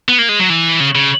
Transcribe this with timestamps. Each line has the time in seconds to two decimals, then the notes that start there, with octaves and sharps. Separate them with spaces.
0.09 B3
0.19 A#3
0.29 G#3
0.40 F#3
0.50 E3
0.80 C#3
0.95 C#3